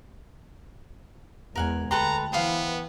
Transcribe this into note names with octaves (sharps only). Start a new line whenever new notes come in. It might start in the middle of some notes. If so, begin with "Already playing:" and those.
E2 G#3 A#4 F#5 G#5
D2 A4 B4 G5 A5 A#5 C6
E3 B3 C5 F5